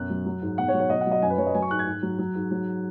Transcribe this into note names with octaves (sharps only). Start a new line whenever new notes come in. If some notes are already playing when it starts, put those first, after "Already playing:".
Already playing: F#2 B2 F#6
F#3
F#3
G#2
B2 F#5
C#5
F#3
C#5
B2 D#5
F#5
F#3
D#5
F#2 G#5
B4
F#3 C#5
D#5
F#3 G#5
C#6
G#2 F#6
G#6
G#2
F#3
F#3
G#2
F#3